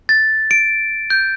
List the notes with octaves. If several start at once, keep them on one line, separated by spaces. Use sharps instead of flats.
A6
D7
G6